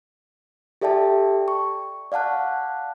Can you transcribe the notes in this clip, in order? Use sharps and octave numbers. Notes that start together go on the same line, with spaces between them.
G4 A4 D5 E5 G5 A5
C#6
D5 F5 F#5 A5 F#6